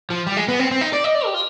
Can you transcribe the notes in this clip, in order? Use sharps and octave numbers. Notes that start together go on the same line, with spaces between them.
F3
G3
G#3
B3
C4
C4
D#4
D5
D#5
D5
G4
F4